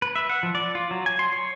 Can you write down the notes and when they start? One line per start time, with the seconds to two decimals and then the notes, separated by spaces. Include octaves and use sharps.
0.02 B4
0.16 E5
0.29 F#5
0.43 F3
0.55 D5
0.75 F4
0.91 F#3
1.06 G#5
1.19 C6
1.33 C#5